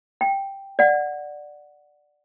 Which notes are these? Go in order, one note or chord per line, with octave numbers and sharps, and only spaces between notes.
G5
D5 F#5